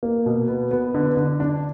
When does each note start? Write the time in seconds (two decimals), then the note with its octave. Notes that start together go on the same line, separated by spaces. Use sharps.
0.03 A#3
0.26 B2
0.48 B3
0.71 B3
0.94 D3
1.17 D3
1.40 D4